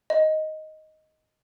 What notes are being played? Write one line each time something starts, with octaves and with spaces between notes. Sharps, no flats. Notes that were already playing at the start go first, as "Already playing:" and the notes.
D#5